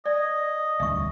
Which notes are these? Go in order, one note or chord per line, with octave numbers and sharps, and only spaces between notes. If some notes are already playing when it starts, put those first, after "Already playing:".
D5 D#5
E1 D2 G2 E5 C#6